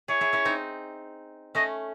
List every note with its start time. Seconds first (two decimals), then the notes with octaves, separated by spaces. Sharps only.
0.08 E4 G#4 C#5
0.21 E4 G#4
0.33 C#4 E4
0.45 C4 D#4
1.55 A3 C#4 D#5